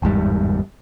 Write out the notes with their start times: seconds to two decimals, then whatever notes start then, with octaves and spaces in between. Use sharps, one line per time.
0.02 G1 E2 G#2 G3